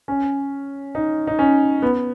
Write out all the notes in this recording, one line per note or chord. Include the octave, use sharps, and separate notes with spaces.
C#4
D#4
D#4
C#4
B3